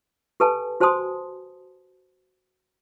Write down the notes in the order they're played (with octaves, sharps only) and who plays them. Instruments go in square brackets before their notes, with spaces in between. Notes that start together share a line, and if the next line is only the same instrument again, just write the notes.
[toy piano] G4 A4 B4 G#5 A5
F#4 C5 G#5 A5 C6 D#6